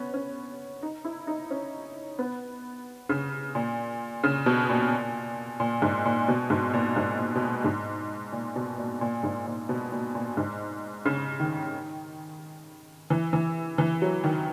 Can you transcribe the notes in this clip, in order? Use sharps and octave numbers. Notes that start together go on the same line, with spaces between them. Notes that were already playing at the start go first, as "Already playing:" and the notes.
Already playing: B3 C#4
C#4
D#4
E4
D#4
C#4
B3
C#3
A#2
C#3
B2
A#2
A#2
G#2
A#2
B2
G#2
A#2
G#2
A#2
B2
A#2
G#2
A#2
B2
A#2
A#2
G#2
A#2
B2
A#2
A#2
G#2
C#3
D#3
E3
E3
E3
F#3
D#3